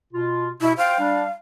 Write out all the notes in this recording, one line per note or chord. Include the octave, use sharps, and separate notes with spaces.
B2 F4
B2 E4
C5 F5 G5
G3 D4